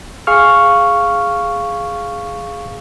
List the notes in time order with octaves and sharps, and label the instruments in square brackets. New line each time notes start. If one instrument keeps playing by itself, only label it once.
[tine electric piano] G#4 F5 C#6 F6